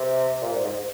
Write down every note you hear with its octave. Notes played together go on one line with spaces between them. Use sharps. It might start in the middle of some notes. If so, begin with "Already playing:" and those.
Already playing: C3
A#2
G#2
G#2